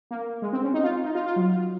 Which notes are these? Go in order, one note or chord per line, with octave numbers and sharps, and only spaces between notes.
A#3
G#3
C4
C#4
D#4
F4
D#4
F4
F4
F#3